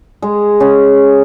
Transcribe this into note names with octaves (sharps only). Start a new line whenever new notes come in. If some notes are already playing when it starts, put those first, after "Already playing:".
G#3
C#4